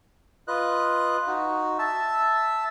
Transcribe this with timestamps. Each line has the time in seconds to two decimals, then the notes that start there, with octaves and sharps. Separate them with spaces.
0.48 F4 B4 D#5 F#6
1.27 D#4 F#4
1.79 E5 A5 E6